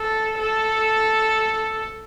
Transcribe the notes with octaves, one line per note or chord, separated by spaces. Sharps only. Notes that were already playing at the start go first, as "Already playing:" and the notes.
Already playing: A4
A4